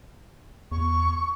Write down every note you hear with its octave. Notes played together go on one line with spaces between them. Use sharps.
E2 C#6